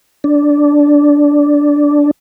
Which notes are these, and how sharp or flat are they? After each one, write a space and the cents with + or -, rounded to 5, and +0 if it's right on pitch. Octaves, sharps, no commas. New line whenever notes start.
D4 -10